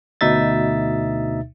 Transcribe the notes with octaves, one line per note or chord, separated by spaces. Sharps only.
D2 B2 D#4 E5 A6